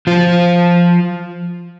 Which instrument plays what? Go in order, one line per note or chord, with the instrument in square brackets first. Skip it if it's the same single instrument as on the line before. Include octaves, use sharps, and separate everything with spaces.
[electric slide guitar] F3 F4